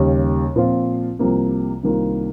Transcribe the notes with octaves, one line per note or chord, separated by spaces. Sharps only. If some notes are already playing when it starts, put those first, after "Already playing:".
Already playing: D#2 C#3 G3 C#4
A#2 F3 C4 F4
C2 C3 F3 A#3
C2 C3 D#3 A#3 F4